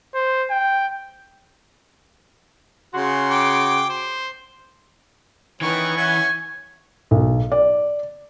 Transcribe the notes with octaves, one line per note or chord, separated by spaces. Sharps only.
C5
G5
C#3 F#4 C6
G5 D6
C5
D#3 E3 B3 C#4 C#6
C#4 E5 F#5 G#5
B1
D5